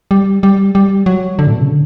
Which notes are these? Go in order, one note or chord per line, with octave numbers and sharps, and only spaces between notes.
G3
G3
G3
F#3
D3
A2
B2
C#3
D3